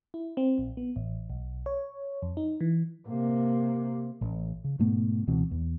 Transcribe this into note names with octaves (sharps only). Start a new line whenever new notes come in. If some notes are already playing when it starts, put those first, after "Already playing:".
E4
C4
A#1
B3
A1
B1
C#5
F2
D#4
E3
C3 A#3
A1
C#3
G#2 B2 A3 B3
C#2 B2 E3 C4
E2